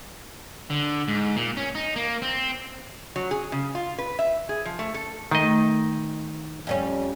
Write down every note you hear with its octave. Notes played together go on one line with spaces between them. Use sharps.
D3
G#2
A#2
C#4
D#4
A#3
C4
F#3
G#4
C#3
F4
B4
E5
G#4
F3
A3
A4
D#3 A3 D#5
F2 G3 C#4